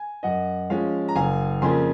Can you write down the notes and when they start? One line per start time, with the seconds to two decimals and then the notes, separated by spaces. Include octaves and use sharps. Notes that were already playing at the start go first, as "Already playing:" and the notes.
Already playing: G#5
0.23 F#2 D#5 F#5
0.70 F3 G#3 C#4 F5
1.08 A#5
1.15 F#1 F5 G#5
1.62 F2 C#3 F3 A#3 G#5 C6